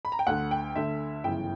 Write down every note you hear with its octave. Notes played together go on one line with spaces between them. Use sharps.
B5
A#5
G5
D2 D3 F#5
G5
D2 D3 E5
G1 F#2 C#3 E3 G5